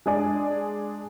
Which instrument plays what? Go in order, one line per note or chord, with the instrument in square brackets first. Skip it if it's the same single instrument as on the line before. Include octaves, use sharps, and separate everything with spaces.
[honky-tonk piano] G#3 D4 G#4 D5